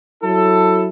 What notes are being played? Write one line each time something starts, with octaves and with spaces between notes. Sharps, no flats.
F#3 E4 A4